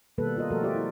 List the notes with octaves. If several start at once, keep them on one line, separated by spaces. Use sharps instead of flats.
B2 D#3 G3 A#3 A4 B4
F4 A#4 D#5
B2 F3 A3 F#4 A4 A#4
F4 G4 D5 E5
E4